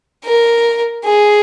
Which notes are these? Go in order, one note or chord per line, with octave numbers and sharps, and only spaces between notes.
A#4
G#4